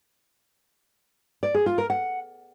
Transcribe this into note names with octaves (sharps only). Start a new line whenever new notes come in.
D5
G#4
F4
A#4
F#5